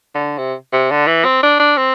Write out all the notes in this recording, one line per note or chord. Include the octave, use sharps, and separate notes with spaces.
D3
C3
C3
D3
E3
C4
D4
D4
C4